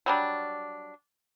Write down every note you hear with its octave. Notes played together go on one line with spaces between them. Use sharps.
F#3 G3 D4